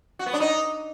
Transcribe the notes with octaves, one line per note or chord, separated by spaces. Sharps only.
F#4
B3
D4
D#4